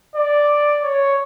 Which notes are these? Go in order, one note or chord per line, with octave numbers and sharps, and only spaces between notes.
D5
C#5